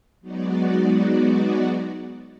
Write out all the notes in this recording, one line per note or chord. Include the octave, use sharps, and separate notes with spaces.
F#3 G#3 B3 D#4 F#4 D5